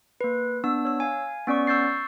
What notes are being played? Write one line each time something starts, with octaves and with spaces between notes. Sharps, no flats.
A#3 B4
B3 D4 E6
C#5 E6
F5 G#5
B3 C#4 D5 C#6
C#6 E6 G6 A6 C7